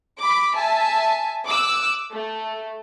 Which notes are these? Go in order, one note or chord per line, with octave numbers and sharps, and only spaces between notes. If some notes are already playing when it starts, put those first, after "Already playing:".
B5 D6
E5 G#5 A5
D6 E6 F#6
A3